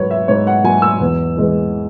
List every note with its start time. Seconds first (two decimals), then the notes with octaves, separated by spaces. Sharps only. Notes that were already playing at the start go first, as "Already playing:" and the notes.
Already playing: G#2 F#3 B4 C#5
0.11 E5
0.28 G#2 C#5
0.47 F#5
0.64 F#3 G#5
0.82 E6
1.00 E2
1.37 E3 G#3